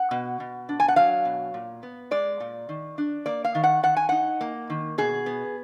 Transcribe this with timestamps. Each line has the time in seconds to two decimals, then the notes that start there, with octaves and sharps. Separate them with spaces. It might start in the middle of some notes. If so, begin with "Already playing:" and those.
Already playing: F#5
0.11 B2
0.40 B2
0.69 D4
0.80 G#5
0.88 F#5
0.96 F#3 F5
1.25 B2
1.54 A#2
1.83 B3
2.11 G#3 D5
2.40 A#2
2.69 D#3
2.98 D4
3.26 A#3 D5
3.44 F5
3.55 D#3
3.64 F#5
3.83 D#3 F#5
3.97 G#5
4.09 D#4 F#5
4.41 A#3
4.70 D#3
4.98 B2 G#4
5.26 B3